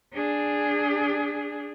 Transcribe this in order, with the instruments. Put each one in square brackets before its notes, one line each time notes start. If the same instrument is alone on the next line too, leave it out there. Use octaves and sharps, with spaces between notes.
[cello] D4 G#4